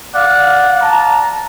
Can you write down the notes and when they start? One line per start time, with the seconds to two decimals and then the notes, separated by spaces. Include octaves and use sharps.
0.15 D5 F5 F#5
0.82 A5 A#5